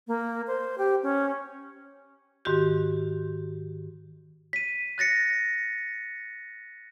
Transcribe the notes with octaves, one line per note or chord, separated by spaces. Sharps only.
A#3
C5
G4
C#4
G#2 D#3 F#4 G4
B6 D#7
F#6 A6 A#6 C#7